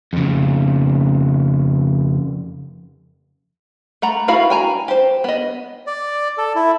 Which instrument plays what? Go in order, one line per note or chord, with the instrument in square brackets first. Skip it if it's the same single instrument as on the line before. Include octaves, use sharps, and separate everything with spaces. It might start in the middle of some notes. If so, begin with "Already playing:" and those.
[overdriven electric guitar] F2 C#3
[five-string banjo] A3 F#5 A#5 B5
A3 E4 F#4 F5 B5
G5 G#5 A#5
G4 C5
B3 D#5
[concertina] D5
A4
E4